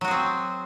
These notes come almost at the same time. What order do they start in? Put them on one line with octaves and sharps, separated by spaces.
F#3 F#4 G#4 C4